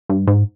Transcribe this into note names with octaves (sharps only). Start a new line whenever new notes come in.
G2
G#2